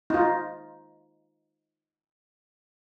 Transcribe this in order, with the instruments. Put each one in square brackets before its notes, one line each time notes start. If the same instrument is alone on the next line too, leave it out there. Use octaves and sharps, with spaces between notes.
[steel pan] D#4 F4